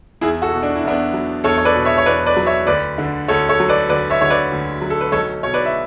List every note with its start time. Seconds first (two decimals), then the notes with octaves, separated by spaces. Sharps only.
0.21 E2 E4 G#4
0.42 F#4 A4
0.53 B2
0.63 D4
0.76 E4
0.84 E2 B3 D4
1.13 F#3
1.44 E2 A4 C#5
1.58 C#5
1.65 B4 D5
1.75 B2
1.85 C#5 E5
1.98 C#5
2.06 E2 B4 D5
2.26 B4 D5
2.37 F#3
2.46 C#5 E5
2.67 D2 B4 D5
2.98 D3
3.28 D2 A4 C#5
3.49 A4 C#5
3.60 F#3
3.69 B4 D5
3.89 D2 B4 D5
4.10 C#5 E5
4.21 D3 C#5
4.30 B4 D5
4.51 D2
4.81 F#3
4.90 A4
5.01 B4
5.12 B1 A4 C#5
5.43 B2 C#5
5.54 B4 D5
5.65 E5